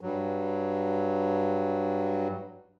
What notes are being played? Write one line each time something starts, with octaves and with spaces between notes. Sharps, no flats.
G2 F#3